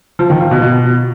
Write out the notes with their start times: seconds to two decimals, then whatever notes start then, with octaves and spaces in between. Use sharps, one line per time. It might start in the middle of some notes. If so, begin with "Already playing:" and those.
0.19 F3
0.30 D#3
0.40 F3
0.51 B2
0.62 B2